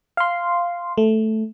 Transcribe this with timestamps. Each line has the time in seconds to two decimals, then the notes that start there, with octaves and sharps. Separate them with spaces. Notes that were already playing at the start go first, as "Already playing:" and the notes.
0.17 F5 C6
0.98 A3